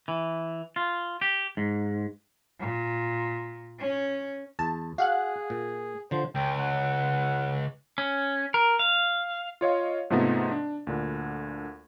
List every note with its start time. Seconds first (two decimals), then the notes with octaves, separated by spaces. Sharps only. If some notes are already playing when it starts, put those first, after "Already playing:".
0.08 E3
0.76 F4
1.21 G4
1.57 G#2
2.59 A#2
3.79 C#4
4.59 E2 A5
4.98 F#4 G#4 F5 F#5 F#6
5.50 A#2
6.11 D3 F3 C5
6.35 C#2 G5
6.58 F#5
7.98 C#4
8.54 A#4
8.79 F5
9.61 F4 C#5 D#5 F5
10.10 G#2 C3 F3 A3 B3 D#4
10.51 D4
10.87 D2 A#2 D3